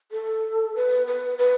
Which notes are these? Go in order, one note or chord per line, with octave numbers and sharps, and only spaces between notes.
A4
B4
B4
B4